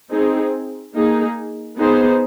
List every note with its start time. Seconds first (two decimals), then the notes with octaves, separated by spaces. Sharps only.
0.11 C4 D#4 G#4
0.94 A#3 D#4 G#4
1.78 B3 D#4 G#4 C5